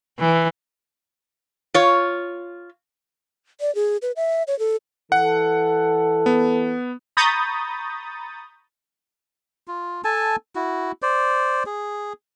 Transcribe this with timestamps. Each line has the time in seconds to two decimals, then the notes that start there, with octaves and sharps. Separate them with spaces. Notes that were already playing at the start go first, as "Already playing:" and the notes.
0.19 E3
1.74 F4 C#5
3.61 D5
3.75 G#4
4.02 B4
4.16 E5
4.47 C#5
4.59 A4
5.12 E3 A4 F#5
6.26 B3
7.17 A#5 B5 C#6 D#6 G6 A6
9.68 F4
10.04 A4 G#5 A5
10.55 E4 F#4
11.02 C5 D5
11.66 G#4